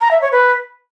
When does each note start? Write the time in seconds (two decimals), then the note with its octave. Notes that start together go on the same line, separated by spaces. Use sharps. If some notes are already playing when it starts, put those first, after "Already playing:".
0.01 A#5
0.11 E5
0.21 C#5
0.32 B4